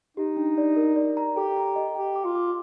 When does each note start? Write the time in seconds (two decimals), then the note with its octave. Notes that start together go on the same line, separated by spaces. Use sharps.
0.17 D#4 G4
0.37 D4
0.58 D5
0.76 A#4
0.96 D5
1.17 A#5
1.36 G4 A4
1.57 A#5
1.76 D#5
1.95 G4 G5
2.16 D6
2.25 F4
2.35 D6